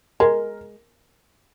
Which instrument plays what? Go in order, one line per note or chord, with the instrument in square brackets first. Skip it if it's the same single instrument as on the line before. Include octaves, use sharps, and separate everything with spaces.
[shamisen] G#3 [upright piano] A#4